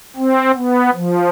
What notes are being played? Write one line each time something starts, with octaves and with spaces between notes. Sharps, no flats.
C4
B3
F3